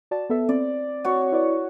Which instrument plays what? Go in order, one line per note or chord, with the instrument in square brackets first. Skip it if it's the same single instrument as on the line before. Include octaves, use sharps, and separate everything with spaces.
[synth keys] F#4 D5 A5
B3 A4 E5
[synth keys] C4 [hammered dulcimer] D5
[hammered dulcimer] F#4 C#5
[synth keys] E4 B4 D5